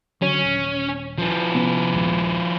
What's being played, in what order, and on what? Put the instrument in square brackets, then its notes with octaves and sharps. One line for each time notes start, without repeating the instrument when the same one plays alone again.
[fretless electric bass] D3 F#3 [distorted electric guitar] C#4
[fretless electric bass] D#1
[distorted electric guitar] F3 E4
[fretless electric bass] C3 B3 C#4
A#1 D#2 G#3